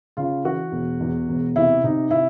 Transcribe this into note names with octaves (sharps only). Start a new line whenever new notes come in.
C#3 F4
E3 F#4
E1
E2
E1
C3 E4
C3 D#4
C3 E4